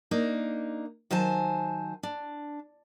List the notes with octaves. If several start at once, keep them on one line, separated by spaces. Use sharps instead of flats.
A#3 D4 D#4
D#3 F#3 C5 G#5 A5
D4